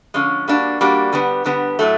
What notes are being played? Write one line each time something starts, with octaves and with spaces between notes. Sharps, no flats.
D3 F3 G#3 C#4
G3 A#3 D4 F#4
G3 A#3 D4 F#4
D3 G3 B3
D3 G3 B3
A2 F#3 A3